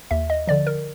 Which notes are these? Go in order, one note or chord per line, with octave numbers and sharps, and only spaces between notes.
D#2 E5
D#5
D3 F3 D5
A#4